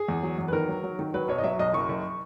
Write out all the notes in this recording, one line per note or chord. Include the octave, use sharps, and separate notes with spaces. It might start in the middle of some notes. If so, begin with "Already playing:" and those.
Already playing: G#4
E2
F#3
E2
B4
D#3 A#4
F#3
F#3
D#3
F#3 B4
B1 C#5
D#5
F#3 E5
B1 D#5
F#1 C#6
F#1